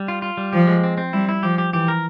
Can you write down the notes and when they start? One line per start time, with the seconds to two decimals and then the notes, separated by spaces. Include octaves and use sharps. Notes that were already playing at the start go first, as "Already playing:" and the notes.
Already playing: G3
0.08 F4
0.22 F4
0.37 G3
0.53 F3 G4
0.67 G#3
0.83 C4
0.98 C4
1.13 G3 E4
1.29 E4
1.43 F3 G4
1.58 G4
1.73 E3 G4
1.88 A#4